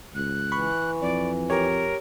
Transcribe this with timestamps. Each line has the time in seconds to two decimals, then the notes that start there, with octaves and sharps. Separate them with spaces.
0.15 C#2 F#6
0.52 E3 B5 C#6
1.01 F2 D5
1.50 G4 A#4 C#5